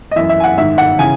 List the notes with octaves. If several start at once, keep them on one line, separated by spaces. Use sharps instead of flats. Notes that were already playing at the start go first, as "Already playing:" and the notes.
D#5
F#2 E3 E5
E5
G#5
F#5
G#2 D#3 E5
F#5
C#3 E3 G#5